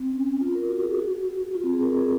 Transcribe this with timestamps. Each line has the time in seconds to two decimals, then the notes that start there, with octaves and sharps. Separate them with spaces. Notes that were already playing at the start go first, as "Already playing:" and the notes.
Already playing: C4
0.12 C#4
0.41 F4
0.55 A#4
0.69 F#4
0.83 G#4
0.97 F#4
1.55 F4
1.64 C4
1.73 G#4
1.82 A#4
1.97 G#4